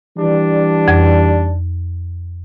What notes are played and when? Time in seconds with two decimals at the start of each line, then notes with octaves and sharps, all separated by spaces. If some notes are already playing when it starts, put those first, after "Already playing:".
0.17 E3 G3 D4
0.88 F2